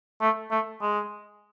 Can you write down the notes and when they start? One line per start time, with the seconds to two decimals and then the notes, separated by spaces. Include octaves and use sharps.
0.21 A3
0.51 A3
0.81 G#3